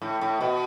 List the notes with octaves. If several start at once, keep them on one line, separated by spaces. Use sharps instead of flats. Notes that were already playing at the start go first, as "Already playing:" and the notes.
A2
A2
B2